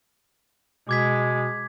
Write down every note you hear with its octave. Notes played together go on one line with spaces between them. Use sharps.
B2 G#3 D6 G#6 B6